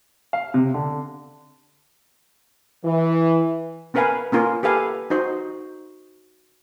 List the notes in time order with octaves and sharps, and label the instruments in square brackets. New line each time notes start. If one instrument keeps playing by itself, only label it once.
[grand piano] F5
C3
D3
[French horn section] E3
[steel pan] B3 C#4 A#4 B4 F5 G#5
A#3 C#4 F4 A#4
G4 A4 B4 F5 G#5
D#4 F#4 C5 D#5